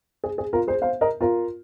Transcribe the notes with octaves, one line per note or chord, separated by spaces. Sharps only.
G#4
G#4
F4 A#4
G#4 C5
C5 F5
A#4 D#5
F4 A#4